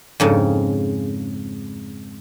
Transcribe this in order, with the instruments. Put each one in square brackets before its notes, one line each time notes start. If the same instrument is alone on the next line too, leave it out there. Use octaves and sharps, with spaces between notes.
[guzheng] F2 G#2 C#3